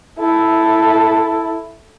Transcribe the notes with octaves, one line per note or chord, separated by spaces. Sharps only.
E4 A4